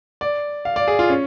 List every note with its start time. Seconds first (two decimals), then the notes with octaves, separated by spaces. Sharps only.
0.21 D5
0.65 F5
0.76 D5
0.88 G#4
0.99 F4
1.09 C#4